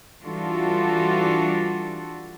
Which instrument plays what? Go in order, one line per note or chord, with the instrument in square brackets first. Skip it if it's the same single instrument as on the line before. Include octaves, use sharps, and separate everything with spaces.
[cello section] E3 G3 D4 F4 F#4 A4